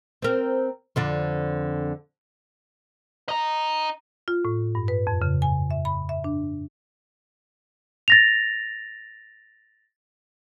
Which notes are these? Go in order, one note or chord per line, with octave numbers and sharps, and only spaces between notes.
C4 A#4
F2 D3 D4
D#5 A#5
F4
A2
G2
B4
F2
C#3
G#5
E5
B5
E5
D4
A6 A#6 F7